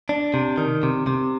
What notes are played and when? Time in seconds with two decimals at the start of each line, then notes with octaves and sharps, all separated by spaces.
0.09 D4
0.34 C3
0.58 D#3
0.83 C3
1.07 C3